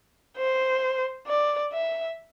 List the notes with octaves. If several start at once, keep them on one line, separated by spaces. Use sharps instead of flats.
C5
D5
E5